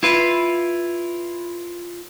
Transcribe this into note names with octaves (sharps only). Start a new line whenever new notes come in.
E4 F4 B4